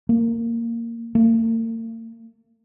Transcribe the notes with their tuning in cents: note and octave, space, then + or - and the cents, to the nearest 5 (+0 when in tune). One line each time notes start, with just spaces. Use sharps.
A#3 -10
A#3 -45